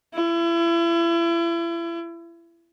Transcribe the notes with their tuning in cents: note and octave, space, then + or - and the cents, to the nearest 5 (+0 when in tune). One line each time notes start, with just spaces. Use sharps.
E4 +35